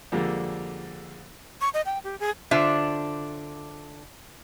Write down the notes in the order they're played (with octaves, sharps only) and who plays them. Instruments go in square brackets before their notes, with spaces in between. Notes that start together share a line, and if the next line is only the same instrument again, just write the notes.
[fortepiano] F2 D3 F3 G3 G#3 A#3
[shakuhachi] C#6
D#5
G5
G4
G#4
[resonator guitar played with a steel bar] D3 D4 F4 C5 E5